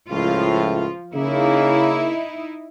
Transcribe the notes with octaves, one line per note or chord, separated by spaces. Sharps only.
C#2 A2 F3 F4
C#3 A#3 D#4 E4